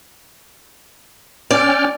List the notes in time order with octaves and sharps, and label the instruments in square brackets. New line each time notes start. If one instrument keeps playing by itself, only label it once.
[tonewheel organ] C#4 G5 F6 [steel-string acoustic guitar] D5